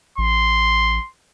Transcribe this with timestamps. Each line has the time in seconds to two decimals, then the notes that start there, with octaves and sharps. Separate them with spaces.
0.18 A1 C6